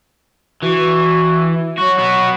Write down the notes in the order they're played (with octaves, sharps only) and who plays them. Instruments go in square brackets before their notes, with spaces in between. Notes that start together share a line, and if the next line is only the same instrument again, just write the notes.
[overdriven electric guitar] E3 [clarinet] F#4
[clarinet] F#3 [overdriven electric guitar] F#4
[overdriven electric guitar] B3 F#4